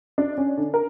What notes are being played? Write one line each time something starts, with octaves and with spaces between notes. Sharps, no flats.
D4
C#4
D3
A#4